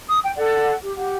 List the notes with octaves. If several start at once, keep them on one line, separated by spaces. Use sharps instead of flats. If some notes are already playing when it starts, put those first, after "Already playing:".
D#6
G5
A4 D5 F#5
G4
G4 F#5